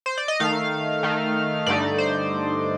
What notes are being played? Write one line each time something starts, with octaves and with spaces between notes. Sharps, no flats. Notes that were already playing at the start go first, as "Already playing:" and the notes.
C5
D5
D#5
D#3 A3 D#4 F5
D#3 A3 D#4
G2 D3 A3 D#4 D5
C5